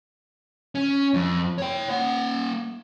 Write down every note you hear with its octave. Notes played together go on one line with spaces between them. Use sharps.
C#4
F2
C#5 G5
A#3 F#5